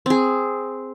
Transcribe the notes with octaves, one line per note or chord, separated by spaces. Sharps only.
C4 G#4